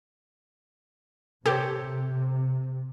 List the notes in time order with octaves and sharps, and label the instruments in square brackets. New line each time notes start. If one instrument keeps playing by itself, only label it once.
[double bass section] C3 [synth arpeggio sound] G4 [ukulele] A4 C5 C#5